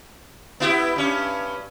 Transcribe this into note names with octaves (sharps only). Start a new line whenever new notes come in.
B3 E4 G4
G2 C#4